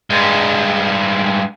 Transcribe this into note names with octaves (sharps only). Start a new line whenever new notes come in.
G2 G#3